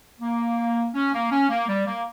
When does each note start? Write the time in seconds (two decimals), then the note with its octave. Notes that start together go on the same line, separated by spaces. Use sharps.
0.20 A#3
0.94 C#4
1.13 A#3
1.30 C#4
1.49 A#3
1.67 G3
1.86 A#3